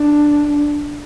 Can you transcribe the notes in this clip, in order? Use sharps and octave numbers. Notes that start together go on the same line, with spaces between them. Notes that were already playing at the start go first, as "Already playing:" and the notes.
Already playing: D4